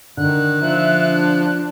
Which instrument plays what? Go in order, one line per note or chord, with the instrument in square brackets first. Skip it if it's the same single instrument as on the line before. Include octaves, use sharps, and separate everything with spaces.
[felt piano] D3 [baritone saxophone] D#3 [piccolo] F#6
[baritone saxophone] F3 [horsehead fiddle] E5
[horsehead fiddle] D4